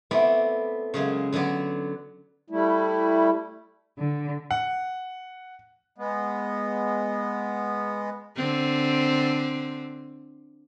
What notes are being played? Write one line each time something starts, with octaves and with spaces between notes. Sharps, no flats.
A3 B3 C4 E4 D5
C#3 F#3 G#3 A#3
D3 F#3 B3 B4 D5
G3 A3 E4
D3
F#5
G#3 B3
D3 C4